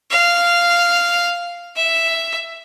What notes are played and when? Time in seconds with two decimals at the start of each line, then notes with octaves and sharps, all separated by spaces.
0.10 F5
1.76 E5